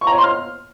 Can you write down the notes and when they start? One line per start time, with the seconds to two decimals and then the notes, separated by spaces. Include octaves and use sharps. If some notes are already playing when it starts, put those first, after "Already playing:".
0.01 C#6
0.07 A#5
0.12 C#5
0.18 C6
0.24 F6